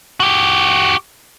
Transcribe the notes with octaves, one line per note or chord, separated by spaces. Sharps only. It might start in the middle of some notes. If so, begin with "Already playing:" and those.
F#4 G4